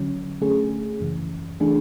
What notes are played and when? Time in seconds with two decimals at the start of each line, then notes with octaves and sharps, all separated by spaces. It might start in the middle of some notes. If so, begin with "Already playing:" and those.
Already playing: D3 F#3 C#4
0.42 D3 A3 C#4 G#4
1.00 F#2 C#3 E3
1.60 E3 A3 D4 G#4